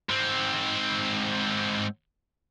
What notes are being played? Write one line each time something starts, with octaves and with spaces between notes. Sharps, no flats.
G#2 C4